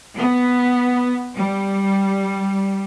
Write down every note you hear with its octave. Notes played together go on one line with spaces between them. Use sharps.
B3
G3